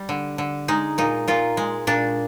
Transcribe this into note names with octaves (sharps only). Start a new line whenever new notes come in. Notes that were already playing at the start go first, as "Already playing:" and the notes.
Already playing: G3
D3
D3
G#3 D#4
A#2 D#4
A#2 F4
G#3
A#2 D4